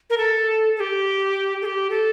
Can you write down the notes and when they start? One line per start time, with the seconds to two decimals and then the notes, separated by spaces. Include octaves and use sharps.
0.10 A#4
0.18 A4
0.76 A4
0.80 G4
1.62 A4
1.65 G4
1.90 A4